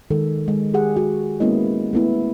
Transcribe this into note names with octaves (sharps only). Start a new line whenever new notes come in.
D#3 G#3 A4
G#3
G4 G#4 F#5
F#4
G#3 A#3 B3 C#4 E4 D#5
A3 B3 E4